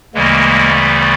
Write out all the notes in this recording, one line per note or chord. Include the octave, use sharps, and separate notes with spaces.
D2 C#3 E3 G3 G#3 A#3
A3 B3